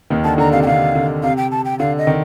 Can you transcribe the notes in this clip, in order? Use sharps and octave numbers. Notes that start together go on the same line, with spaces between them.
D#2 D#3
D3 A5
D3 A#5
C3 F5
G5
D3 F5
D3
C3 F5
G5
A5
G5
D3 F5
D#5
D#3